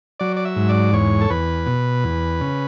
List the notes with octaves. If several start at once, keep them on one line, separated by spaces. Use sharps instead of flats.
F#3 D5
D5
E5
G#2
D5
E2 C#5
A4
E2 B4
B2
E2
C#3